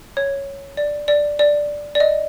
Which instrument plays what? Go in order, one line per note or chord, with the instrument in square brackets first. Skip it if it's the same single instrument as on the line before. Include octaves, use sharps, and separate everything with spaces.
[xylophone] C#5
D5
D5
D5
D5
D#5